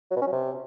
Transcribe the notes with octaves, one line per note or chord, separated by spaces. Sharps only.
F#3
B2
C#4
F#3
C3